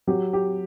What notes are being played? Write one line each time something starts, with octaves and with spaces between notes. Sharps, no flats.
F#3 G4
G4